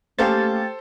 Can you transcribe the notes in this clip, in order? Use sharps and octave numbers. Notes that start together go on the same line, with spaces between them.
A3 A#3 C#4 G4 A4 C5 F5 A6